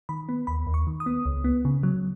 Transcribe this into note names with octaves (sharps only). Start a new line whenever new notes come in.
D#3 B5
B3
D#2 B5
D#2
C#6
D#3
D#6
B3
C#2
B3
C#3
F#3